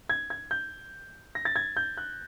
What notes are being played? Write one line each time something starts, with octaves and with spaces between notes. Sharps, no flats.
G#6
G#6
G6
A#6
A6
G#6
G6
F#6